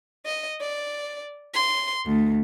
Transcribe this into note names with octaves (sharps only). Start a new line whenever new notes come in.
D#5
D5
C6
D2